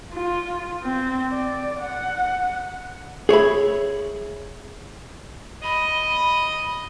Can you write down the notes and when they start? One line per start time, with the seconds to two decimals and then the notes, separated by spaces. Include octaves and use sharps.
0.13 F4
0.83 C4
1.31 D5
1.80 F#5
3.29 G#4 C#5 E5 B5
5.64 D#5 B5